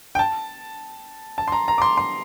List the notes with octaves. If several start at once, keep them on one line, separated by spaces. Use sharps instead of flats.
G5
A5
A5
C6
A#5
A#5
D6
C6
C6